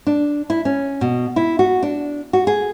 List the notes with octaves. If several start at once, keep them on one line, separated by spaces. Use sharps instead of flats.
D4
E4
C#4
B2
E4
F#4
D4
F#4
G#4